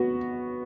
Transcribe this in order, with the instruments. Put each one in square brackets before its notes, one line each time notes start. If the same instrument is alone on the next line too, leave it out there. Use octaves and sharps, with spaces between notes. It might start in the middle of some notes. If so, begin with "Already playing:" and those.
Already playing: [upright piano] B3 [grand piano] F#4